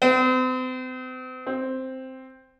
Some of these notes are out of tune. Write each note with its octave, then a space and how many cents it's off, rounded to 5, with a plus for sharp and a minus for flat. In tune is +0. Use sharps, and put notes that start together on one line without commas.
C4 -40
C4 +0